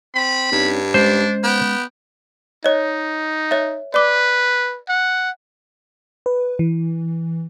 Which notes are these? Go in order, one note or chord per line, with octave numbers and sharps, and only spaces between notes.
C4 B5
G2 C4 C#4 D#4
G#3 C#4 D4 C5 D#5
B3 G5
D#4 C#5 D#5
C#5 E5
B4 D5 D6
F#5
B4
E3